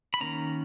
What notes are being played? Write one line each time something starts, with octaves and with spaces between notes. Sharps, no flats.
B5
D#3 A#3 C#4 A#5